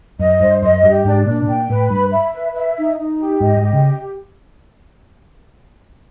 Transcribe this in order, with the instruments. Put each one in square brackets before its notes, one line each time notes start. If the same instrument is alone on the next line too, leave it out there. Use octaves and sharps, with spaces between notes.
[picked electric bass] F#2 [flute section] D#5
[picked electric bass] G2 [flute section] C5
[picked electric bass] F#2 [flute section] D#5
[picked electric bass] G2 [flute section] G4
[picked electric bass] G#2 [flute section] D4
[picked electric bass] A#2 [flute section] D4
[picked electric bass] B2
[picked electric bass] A#2 [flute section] G5
[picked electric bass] A2 [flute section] B4
[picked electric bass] G2 [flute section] B5
[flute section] E5
B4
E5
D#4
D#4
G4
[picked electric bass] G#2 [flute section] D#5
[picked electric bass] G#2
[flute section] G4
[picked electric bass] C#3